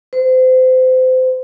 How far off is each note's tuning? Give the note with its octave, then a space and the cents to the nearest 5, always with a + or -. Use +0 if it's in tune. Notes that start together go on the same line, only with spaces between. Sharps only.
C5 -30